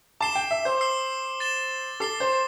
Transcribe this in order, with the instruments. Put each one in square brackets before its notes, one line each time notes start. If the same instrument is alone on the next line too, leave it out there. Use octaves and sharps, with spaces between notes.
[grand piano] A5 [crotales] D6 C7 E7 G7
[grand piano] G5
E5
C5
[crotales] E6 C7 G7
A6 E7 G7
[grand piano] A4 [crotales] D6 C7 G7
[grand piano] C5